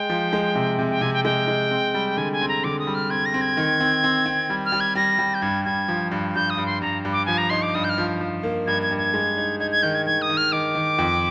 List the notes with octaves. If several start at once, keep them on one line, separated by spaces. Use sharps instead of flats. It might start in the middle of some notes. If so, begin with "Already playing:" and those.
Already playing: G#3 G5
F3
G#3
C3
C3
G5
C3 G#5
G5
G#3 G5
G#3
C4
G3
D3 G#5
G#5
C4
A#5
D3 D6
D#6
G3
F6
C4 G#6
A#6
C4
G#6
D#3
C4
C4
C4
G3
F6
G3
G#6
G3 A#6
G3
G6
G2 G#6
G2 G#6
F3
G2
G2 G6
D#6
G2
C6
G2 A#5
G2
D6
F3 G#5
A#5
D#4 C6
D6
G2 D#6
G6
F6
F3
F3
A#3
G2 G#6
G#6
G2
G#6
G#3
D#4
D#4 G#6
G#6
D#3 G6
G#6
D#3 G#6
D#6
D#3
F6
D#3 D6
D#3
F2